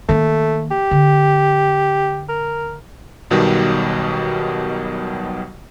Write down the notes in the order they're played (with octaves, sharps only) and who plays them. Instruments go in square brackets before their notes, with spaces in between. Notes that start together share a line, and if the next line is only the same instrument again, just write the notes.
[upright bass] D#3 A#3 [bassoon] A3
[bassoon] G4
[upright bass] D3
[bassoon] A#4
[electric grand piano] B1 B2 D#3 F#3 G3